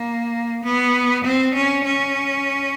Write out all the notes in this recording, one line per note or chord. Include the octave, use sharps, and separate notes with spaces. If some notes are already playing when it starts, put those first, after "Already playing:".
Already playing: A#3
B3
C4
C#4
C#4